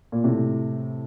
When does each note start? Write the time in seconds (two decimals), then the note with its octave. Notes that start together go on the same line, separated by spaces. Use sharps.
0.12 A#2
0.24 A2 C3